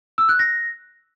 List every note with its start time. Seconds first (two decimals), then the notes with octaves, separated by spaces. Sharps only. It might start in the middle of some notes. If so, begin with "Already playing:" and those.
0.18 E6
0.29 F#6
0.39 A#6